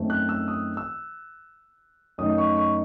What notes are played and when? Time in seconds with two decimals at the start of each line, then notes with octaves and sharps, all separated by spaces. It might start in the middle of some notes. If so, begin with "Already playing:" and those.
Already playing: F#2 D#3 A3 C4
0.10 F#6
0.29 E6
0.48 D#6
0.77 E6
2.18 F#2 D#3 A3 D#4 D#6
2.38 C#6
2.57 C#6